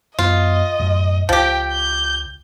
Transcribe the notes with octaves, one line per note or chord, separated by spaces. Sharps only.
F#2 B3 F4 D#5
F#2 A2
C#2 F3 G4 G5
G6